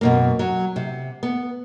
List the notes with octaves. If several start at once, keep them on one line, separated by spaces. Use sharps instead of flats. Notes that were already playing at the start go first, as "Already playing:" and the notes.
F#2 B2 A#3
F#3
C3
B3